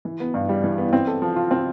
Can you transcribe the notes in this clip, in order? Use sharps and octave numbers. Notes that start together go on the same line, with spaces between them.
E3
B3
G2
G3
E3
B3
C4
A4
F3
F4
C4